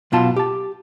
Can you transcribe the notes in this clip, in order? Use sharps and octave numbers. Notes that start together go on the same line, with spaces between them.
B1 B2 F4 A5
G4 A5